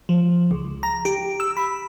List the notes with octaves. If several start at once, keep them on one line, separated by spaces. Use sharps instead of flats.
F3
C#2
A#5
G4
E6
B5